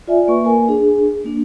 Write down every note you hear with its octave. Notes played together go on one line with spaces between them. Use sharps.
F4 D5 E5 G#5
A#3 B4 C#6
A#3 A#4 G#5
D4 G#4
A#3 D4